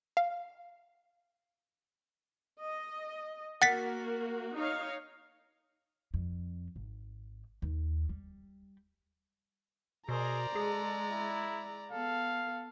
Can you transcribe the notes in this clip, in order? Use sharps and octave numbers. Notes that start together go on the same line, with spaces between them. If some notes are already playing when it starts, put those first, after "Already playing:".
F5
D#5
A#3 F#4 F#5 A6 B6
D#4 C#5 F5
F2
G#1
D#2
G3
B2 G#4 A#4 C5 D5 A#5
G#3 G#4 A4
E4
B3 A4 F5